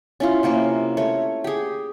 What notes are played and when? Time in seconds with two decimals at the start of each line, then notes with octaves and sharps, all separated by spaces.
0.20 C#4 E4 F4
0.43 C3 A#3 C#4 A#4
0.97 A3 C#5
1.44 G4 G#4